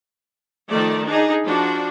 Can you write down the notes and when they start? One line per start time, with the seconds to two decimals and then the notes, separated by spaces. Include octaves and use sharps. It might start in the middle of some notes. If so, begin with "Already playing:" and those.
0.70 D#3 F3 A3 D5
1.06 D4 D#4 G#4
1.45 F3 D4 F#4